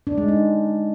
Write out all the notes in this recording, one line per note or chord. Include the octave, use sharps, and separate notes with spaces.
D4
G#3
D#4